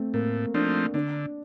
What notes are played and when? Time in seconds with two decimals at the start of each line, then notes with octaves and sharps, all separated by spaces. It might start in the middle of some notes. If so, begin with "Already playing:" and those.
Already playing: A3 C4
0.14 A2 A#3
0.54 F3 A3 C4 D4 D#4
0.94 D3 D4